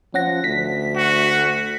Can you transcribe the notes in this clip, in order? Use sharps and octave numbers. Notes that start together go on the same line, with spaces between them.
F3 C#4 F#5 A#6
D2 B6
F#4